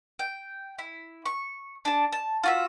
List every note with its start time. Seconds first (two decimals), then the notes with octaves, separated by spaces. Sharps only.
0.19 G5
0.79 E4
1.26 C#6
1.85 D4 A5
2.12 A5
2.44 F4 F#4 E5